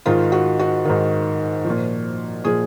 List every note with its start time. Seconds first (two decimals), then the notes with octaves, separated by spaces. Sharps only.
0.06 G#2 D#3 F4
0.32 F#4
0.59 F#4
0.85 G#2 D#3
1.65 A#2 F3
2.44 A#2 F3 G#4